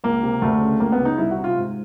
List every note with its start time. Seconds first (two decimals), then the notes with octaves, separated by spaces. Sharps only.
0.04 C#2 A#3
0.23 C3
0.42 D2 A3
0.61 C#3
0.80 C#2 A#3
0.92 B3
0.99 C#3
1.05 D#4
1.18 C2 E4
1.31 F#4
1.37 C3
1.44 F4
1.56 G#2